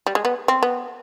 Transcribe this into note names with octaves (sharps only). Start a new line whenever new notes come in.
G3
G#3
B3
C4
B3